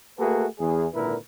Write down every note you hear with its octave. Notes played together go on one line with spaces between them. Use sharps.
A3 A#3 F#4 G#4 A4 B4
E2 G#4
G#1 A#2 D3 E4 A#4 B4